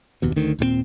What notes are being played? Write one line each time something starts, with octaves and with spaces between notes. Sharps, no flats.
F#1 D#2 B2
D2 D#3
D#1 A#2 G3 C4